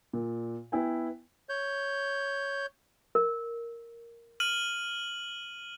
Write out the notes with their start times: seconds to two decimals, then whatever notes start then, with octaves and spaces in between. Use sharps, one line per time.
0.13 A#2
0.72 B3 E4 G5 G#5
1.49 C#5 G6
3.15 A#4
4.40 F6 D#7 F#7